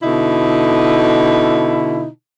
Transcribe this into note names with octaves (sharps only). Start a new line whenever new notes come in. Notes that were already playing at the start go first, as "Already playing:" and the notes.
B2 D3 D#4 E4